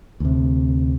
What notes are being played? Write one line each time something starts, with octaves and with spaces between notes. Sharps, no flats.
D2 C3